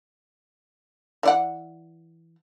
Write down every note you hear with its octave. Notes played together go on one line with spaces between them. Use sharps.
E3 D5 F#5